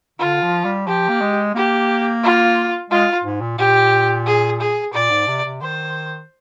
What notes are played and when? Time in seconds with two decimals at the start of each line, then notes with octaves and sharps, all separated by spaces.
0.19 D3 F4
0.42 F3
0.65 G3
0.87 F3 G4
1.09 A#3
1.21 G#3
1.55 A#3 G4
2.23 F4
2.90 G#3 F4
3.24 G#2
3.41 A#2
3.58 A#2 G4
4.26 G#4
4.60 G#4
4.93 A#2 D5
5.11 G#2
5.27 C3
5.44 C3
5.61 D#3 C5